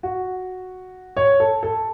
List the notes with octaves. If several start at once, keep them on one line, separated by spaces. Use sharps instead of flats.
F#4
C#5
A4
A4